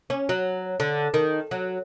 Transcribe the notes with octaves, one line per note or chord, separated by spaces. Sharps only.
C#4
F#3
D3
D#3
F#3